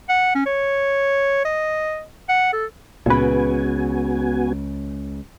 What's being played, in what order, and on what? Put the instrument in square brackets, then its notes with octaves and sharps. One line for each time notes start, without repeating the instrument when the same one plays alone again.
[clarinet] F#5
C#4
C#5
D#5
F#5
A4
[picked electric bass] C#2 C#3 [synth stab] A#2 B4 [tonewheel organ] B3 F#4 G#5